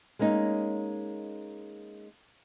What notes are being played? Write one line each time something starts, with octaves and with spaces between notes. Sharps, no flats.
G#3 A#3 C#4 D#4